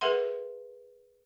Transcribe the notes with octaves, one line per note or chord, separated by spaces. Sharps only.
G#4 A#4 B4 E5 F#5 C6